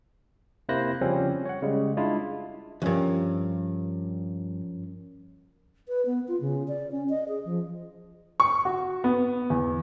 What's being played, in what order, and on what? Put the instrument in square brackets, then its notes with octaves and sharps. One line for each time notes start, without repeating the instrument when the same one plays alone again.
[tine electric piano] C3 A#3 E4 C5 F#6 A#6
C#3 F3 G3 C4 C#4
C#5 F#5
C#3 G3 G#3
G#3 D4 E4 F4
[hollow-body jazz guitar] D2 G2 [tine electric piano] F3 C#4 A#4
[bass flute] B4
B3
F4
C#3
D5
C#4
D#5
G#4
F3
[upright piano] C#6
F#4
B3
E2